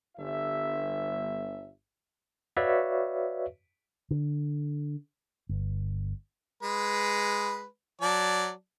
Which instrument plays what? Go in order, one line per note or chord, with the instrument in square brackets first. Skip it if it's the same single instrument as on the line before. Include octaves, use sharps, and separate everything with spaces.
[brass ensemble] G1 E5
[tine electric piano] F#4 B4 C#5 D5 E5 F5
[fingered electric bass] D3
G1
[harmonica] G#3 B4
F#3 D5 A5